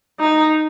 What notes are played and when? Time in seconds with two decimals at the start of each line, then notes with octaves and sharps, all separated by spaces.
0.20 D#4